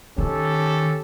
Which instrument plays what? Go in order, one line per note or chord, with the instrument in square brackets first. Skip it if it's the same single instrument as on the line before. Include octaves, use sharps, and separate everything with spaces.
[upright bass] D#3 [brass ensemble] C#4 G4 A4